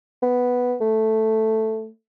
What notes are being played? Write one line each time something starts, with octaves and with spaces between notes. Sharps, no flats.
B3
A3